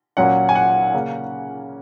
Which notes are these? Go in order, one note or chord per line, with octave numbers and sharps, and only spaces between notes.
A#2 F#3 C#4 F#5
G#5
F#5
C#3 A#3 C#4